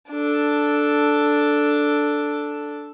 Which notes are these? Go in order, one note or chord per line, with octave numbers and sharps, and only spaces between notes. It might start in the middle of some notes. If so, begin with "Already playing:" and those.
D4 A4